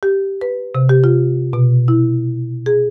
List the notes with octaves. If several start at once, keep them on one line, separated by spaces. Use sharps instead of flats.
G4
B4
C3
G4
F4
B2
E4
G#4